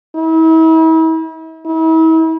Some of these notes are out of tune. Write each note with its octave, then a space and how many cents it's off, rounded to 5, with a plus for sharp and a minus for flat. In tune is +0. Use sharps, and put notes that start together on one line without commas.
E4 -40
E4 -40